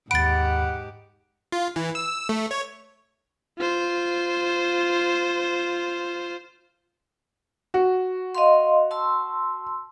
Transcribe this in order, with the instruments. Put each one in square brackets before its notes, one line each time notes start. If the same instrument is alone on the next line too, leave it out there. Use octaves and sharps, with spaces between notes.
[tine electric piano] D#2 B5 [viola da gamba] G#2 G4 [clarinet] F#5 [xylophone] A6 D7
[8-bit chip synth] F4
E3
E6
A3
C#5
[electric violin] F4 C5
[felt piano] F#4
[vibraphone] D#5 F5 C6
A5 C6 E6